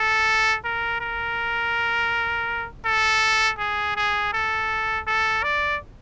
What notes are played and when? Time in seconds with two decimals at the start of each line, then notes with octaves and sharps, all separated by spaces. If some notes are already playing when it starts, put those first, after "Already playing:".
Already playing: A4
0.65 A#4
1.01 A#4
2.85 A4
3.59 G#4
3.96 G#4
4.33 A4
5.07 A4
5.43 D5